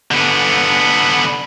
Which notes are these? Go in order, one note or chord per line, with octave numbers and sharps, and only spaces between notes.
D3 B3